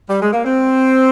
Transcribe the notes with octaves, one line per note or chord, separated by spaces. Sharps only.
G3
G#3
A#3
C4